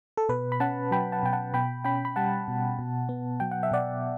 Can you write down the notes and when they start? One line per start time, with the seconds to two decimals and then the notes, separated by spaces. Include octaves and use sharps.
0.17 A4
0.29 B2 B4
0.52 B5
0.60 C#4 F#5 A5
0.91 F#3 G5 B5
1.12 F#5 A5
1.23 B2 G5
1.33 F#5 A5
1.54 B2 G5 B5
1.84 C#4 G5 B5
2.05 B5
2.16 G3 F#5 A5
2.48 B2
2.79 B2
3.09 B3
3.40 F#3 G5
3.51 F#5
3.63 E5
3.71 B2 D5 F#5